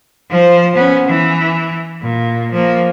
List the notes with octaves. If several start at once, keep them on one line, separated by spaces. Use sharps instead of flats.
F3 C5
B3 C#4
E3
A#2
F3 A#3